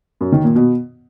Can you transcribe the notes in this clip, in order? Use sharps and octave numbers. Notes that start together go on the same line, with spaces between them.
F#2
D#3
A#2
B2